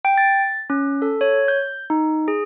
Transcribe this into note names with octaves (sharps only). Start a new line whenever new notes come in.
G5
A6
C#4
A4
C#5
G6
D#4
G#4